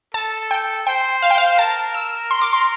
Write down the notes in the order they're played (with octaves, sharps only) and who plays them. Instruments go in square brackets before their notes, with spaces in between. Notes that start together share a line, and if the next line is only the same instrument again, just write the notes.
[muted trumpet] A4 [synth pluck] A5
[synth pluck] G5
[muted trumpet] C5 [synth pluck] G5
[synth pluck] F5
G5
F5
[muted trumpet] A#4 [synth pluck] A5
[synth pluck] E6
C6
D6
C6